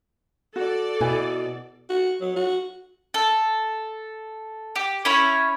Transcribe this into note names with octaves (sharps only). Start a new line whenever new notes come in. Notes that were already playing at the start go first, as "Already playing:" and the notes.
F#4 A4 D5
B2 E4 B4 G#5
F#4
F#3
F#4
A4
G4
C#4 E4 C#5